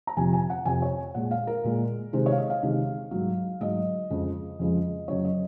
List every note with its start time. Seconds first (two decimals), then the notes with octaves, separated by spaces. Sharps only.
0.07 A#5
0.17 F2 C3 F3 G#5
0.33 G#5
0.50 F#5
0.66 F2 C3 F3 G#5
0.82 C#5
1.14 A#2 G#3 F#5
1.31 F5
1.47 A#4
1.64 A#2 G#3
2.13 C3 D#3 G#3 C5
2.26 C#5
2.32 F5
2.38 D#5
2.50 F5
2.63 C3 D#3 G#3
3.11 G#2 F#3
3.61 G#2 F#3 D#5
4.10 F2 C#3 F3 G#3
4.59 F2 C#3 F3 G#3
5.08 F#2 C#3 F#3 C#5
5.24 D#5